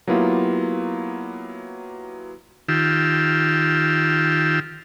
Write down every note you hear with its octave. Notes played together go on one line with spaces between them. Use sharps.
F#3 A#3 B3 E4 F4 G4
D#3 F4 G4 E6